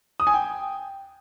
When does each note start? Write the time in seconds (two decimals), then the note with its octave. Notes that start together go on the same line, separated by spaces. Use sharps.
0.20 D#6
0.27 G#5
0.34 G5